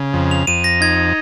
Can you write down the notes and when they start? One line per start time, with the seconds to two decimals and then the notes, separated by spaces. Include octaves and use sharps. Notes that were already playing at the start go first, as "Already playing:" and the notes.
Already playing: C#3
0.13 F2
0.31 F7
0.47 F2 D#7
0.64 A#6
0.81 D#4 G#6